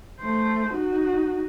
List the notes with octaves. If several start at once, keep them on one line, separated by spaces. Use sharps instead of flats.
A3 C5
D#4 F#4